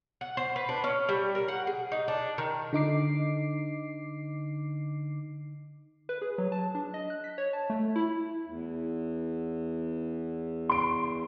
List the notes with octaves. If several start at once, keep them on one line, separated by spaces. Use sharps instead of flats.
F#5
C5
B4
D4
C#4
G3
A#4
F#5
G#4
D#4
D4
D#3
D3 D#4 D6 C7
B4
G#4
F#3
A5
D4
D#5
F#6
B6
C#5
A5
A3
E4
E2
C6 D7